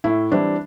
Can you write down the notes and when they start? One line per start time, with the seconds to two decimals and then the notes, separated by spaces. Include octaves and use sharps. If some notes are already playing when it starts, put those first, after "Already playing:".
0.04 A2 E4
0.32 E3 G3 C4 D4